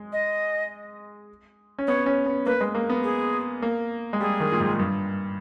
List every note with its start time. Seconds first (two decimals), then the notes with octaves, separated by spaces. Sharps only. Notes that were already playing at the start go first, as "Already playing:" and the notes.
Already playing: G#3
0.13 D#5
1.78 C#4
1.87 B3 C#5
2.06 C#4
2.26 B3
2.46 A#3 B4
2.61 G#3
2.75 A#3
2.89 B3
3.04 G#4
3.62 A#3
4.13 G#3
4.20 G3 G#4
4.40 D#3
4.52 A#2
4.60 G#2
4.79 G2